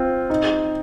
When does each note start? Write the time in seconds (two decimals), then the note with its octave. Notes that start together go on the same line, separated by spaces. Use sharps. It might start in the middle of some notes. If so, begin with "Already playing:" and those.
Already playing: C4 F4
0.30 D#4